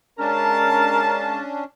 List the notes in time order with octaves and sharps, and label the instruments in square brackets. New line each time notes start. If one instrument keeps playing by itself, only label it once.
[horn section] G#3 F5 A5 [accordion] C#4 D4 [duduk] A#4